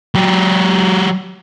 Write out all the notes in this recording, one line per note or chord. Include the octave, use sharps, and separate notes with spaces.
F#3 G4